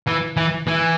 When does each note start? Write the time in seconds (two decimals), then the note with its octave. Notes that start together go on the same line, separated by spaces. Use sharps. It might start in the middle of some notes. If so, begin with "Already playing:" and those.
0.08 E3
0.37 E3
0.67 E3